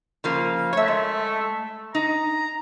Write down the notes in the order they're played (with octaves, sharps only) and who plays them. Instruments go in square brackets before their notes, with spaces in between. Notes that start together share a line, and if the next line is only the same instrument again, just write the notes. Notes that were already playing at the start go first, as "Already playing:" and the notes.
[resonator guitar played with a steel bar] C#3 F3 A#3
[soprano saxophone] A3 [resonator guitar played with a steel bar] C#5 E5
[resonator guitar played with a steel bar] G#3
[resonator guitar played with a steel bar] D#4 [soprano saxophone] A#5